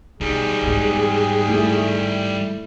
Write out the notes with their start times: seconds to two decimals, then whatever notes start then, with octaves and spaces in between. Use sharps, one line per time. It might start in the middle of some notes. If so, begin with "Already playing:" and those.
0.21 B2 G3 D#4 G#4
0.62 E2 G#2
1.48 A3 E4